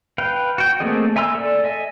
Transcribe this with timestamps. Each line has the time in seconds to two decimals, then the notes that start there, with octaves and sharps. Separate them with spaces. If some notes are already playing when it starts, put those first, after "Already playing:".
0.18 B4 F5 G5
0.58 F#4 G5
0.80 A3 A#3 C4 G#4 D#5
1.16 E5 G#5 A#5 C6 E6
1.35 A4 D5
1.64 D#5 E5 G#5